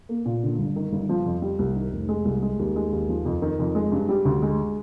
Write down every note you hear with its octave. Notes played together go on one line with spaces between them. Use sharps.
A#3
A#2
D3
G1
D#3
G1
F3
F2
G3
C2
D#3
F1
G#3
C2
G#3
D#2
G#3
D#2
F3
F2
D#3
F2
G#3
G2
G3
D2
G#3